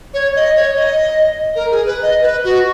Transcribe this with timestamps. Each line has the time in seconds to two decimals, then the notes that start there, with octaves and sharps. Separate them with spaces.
0.14 C#5
0.36 D#5
0.56 C#5
0.77 D#5
1.56 A#4
1.71 G#4
1.86 B4
2.02 D#5
2.22 B4
2.44 F#4